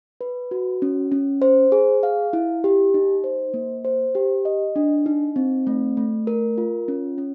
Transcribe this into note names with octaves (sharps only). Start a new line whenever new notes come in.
B4
F#4
C#4
C#4
C5
G#4
F5
E4
G4
D#4
C5
A#3
C5
G4
D#5
D4
D#4
C4
A3
A3
A#4
F4
C#4
C#4